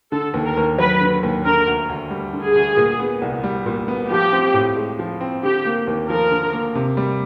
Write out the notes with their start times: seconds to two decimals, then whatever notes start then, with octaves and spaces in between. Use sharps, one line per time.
0.12 D3 A4
0.34 D#2
0.45 A#4
0.57 D#2
0.78 F#3 B4
1.01 D3
1.23 D#2
1.45 D3 A#4
1.67 D2
1.89 D2
2.11 G3
2.33 D3
2.44 G#4
2.56 D2
2.77 A#2
2.99 B3
3.22 C2
3.44 G3
3.66 A#2
3.88 B3
4.10 F3 G4
4.33 C4
4.54 A2
4.76 G#3
4.99 F3
5.21 C4
5.43 D3 G4
5.65 A#3
5.87 D#2
6.09 F3 A#4
6.31 D3
6.53 A#3
6.75 C3
6.97 G3